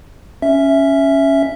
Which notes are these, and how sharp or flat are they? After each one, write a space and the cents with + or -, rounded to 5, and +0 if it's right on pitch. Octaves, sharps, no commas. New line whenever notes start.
C#4 +0 E5 +0